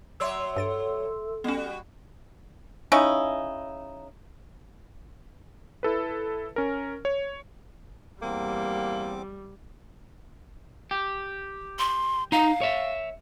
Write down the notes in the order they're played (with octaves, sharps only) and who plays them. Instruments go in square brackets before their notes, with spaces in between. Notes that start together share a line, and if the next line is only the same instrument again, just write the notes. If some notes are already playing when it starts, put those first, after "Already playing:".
[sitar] F#3 C#5 D5 [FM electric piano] E5 C6 E6
[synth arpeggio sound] G2 A6 D7 [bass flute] A4
[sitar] G3 F#4 [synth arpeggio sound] B3 C#4
[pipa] C#3 C#4 D#4 E4
[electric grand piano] E4 A4 B4
C#4 A#4
C#5
[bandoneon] E2 C4 D6 [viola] G3 [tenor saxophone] A#3
[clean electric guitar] G4
[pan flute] C6
[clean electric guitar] D#4 A#5 [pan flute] F5
[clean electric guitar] C#5 E5